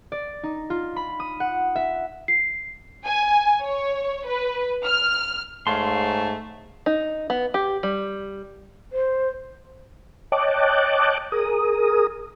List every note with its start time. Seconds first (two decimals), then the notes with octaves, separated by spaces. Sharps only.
0.12 D5
0.43 D#4
0.70 F4
0.96 B5
1.20 D#6
1.40 F#5
1.76 E5
2.28 C7
3.05 G#5
3.63 C#5
4.27 B4
4.86 F6
5.67 G#2 A3 C#5 F5 C6
6.86 D#4
7.30 B3
7.54 G4
7.83 G3
8.92 C5
10.32 C#5 D#5 G5 A5 D6 F#6
11.32 G#4 A#4 D#6